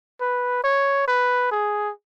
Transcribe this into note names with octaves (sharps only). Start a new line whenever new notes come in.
B4
C#5
B4
G#4